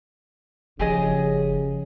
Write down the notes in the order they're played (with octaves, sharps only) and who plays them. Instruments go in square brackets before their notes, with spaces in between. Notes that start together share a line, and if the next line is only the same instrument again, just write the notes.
[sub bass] F#1 [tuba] C#3 [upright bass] F3 C#4 [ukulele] G4 G#4 D#5